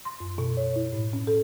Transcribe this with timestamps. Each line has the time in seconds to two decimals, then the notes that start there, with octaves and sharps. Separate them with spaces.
0.05 C6
0.20 F#2
0.38 B2
0.57 C#5
0.76 E4
0.92 A2
1.13 C#4
1.27 A4